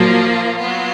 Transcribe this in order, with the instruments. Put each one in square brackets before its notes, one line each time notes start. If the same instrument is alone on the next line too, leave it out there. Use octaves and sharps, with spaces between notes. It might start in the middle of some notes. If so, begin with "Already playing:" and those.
Already playing: [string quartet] A#2 F3 A#3 F4 [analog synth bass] F#3
[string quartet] F#3 B3 F4